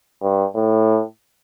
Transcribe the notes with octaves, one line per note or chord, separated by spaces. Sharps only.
G2
A2